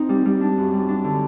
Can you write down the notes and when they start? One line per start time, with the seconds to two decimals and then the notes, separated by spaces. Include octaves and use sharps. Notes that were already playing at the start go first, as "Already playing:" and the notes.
Already playing: C4 D#4
0.09 G3
0.26 G3
0.41 D4
0.57 F#2
0.73 G3
0.89 D4
1.04 D3